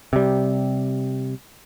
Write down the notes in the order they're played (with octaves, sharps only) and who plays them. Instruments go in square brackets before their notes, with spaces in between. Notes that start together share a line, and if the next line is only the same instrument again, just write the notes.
[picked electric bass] C3 G3